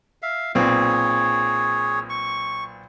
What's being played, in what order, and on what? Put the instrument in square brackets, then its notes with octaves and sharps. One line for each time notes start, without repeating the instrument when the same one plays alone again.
[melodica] E5 F5
[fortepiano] B1 A#2 C4 [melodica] G#4 C#5
[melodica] C#6